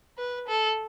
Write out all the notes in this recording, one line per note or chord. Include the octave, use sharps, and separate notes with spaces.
B4
A4